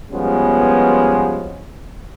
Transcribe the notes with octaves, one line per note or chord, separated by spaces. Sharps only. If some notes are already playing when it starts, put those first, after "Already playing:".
B2 F3 G3 G#3 B3 C#4